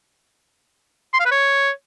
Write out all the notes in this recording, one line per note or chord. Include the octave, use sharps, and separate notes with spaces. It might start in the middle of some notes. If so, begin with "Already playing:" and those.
C6
F5
B4
C#5